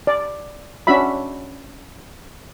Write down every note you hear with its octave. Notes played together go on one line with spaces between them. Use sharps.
D5
C#4 D4 F#4 E5 B5